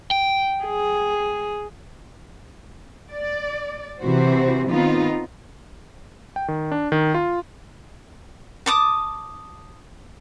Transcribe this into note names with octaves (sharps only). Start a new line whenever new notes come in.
G5
G#4
D5
C3 E3 F#4 C5
D#3 B3 C4 D#4 F4
G5
D#3
D4
D#3
F4
A5 D6 D#6